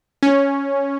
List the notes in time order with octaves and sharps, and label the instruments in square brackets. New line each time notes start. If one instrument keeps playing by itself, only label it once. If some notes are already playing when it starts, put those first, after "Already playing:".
[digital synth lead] C#4